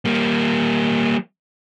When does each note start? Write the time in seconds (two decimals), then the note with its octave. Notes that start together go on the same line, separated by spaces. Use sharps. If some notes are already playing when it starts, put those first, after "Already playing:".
0.05 G3 A#3